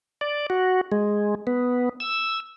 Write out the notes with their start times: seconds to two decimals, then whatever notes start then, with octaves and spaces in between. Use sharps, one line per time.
0.21 D5
0.50 F#4
0.92 G#3
1.47 B3
2.00 E6